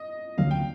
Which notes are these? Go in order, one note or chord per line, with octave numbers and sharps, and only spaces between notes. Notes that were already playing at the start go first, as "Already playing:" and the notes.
Already playing: D#5
D#2 D3 F#3 A#3 F5
G5